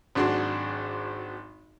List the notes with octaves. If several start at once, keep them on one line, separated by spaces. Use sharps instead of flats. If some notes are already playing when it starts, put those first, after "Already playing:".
G#1 F#3 D4 F#4 G#4 C6